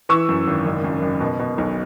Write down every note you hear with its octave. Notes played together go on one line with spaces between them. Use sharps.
E3 C#6 E6
F#2
G#1
F#1
F#2
F#1
B2
B2
B1